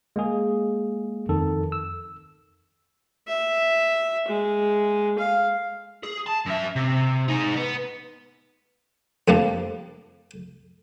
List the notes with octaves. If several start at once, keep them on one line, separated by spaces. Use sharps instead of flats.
G#3 A#3 G#4
F2 D#3 A4
E6
E5
G#3
F5
G#4
A5
F#2 E5
C3
D#4 G#4
B3
F2 G3 A#3 D4